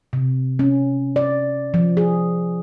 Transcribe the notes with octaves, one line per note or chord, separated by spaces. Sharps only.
C3
C#4
D5
F3
G#4